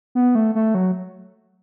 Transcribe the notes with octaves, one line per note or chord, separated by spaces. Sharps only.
B3
A3
A3
F#3